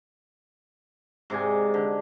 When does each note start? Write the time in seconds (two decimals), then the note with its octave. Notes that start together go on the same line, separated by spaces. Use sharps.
1.30 G#2 C3 D5 G#5
1.74 D3